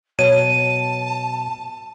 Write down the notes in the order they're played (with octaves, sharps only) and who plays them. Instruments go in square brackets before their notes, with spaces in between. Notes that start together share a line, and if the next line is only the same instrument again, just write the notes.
[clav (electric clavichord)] B2 F#3 [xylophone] C#5 [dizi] A5 [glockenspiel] D#7